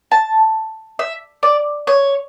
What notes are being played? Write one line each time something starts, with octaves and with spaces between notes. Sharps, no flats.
A5
E5
D5
C#5